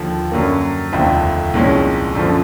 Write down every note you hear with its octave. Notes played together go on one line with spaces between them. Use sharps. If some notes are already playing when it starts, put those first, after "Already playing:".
Already playing: D#2 D3 F3
F#2 D3 F#3 A#3
F1 D#2 D3 F3 A3
C2 A#2 F3 G#3 C#4
F#2 D3 F3